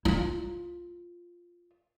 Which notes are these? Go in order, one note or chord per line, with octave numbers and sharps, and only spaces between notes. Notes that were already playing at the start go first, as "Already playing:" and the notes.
E4 F4